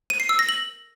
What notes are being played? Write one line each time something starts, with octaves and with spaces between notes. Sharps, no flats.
D#7
C7
E6
A#6
F#7